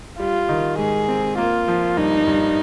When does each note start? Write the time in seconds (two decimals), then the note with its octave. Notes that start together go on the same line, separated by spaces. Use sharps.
0.19 G3 F4
0.49 D#3
0.78 G#2 G#4
1.08 C4
1.38 A#3 F4
1.68 F3
1.97 G2 D#4
2.27 G2